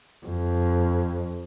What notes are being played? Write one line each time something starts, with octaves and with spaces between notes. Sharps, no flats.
F2